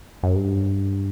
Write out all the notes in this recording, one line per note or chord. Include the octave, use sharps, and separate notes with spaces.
F#2
G2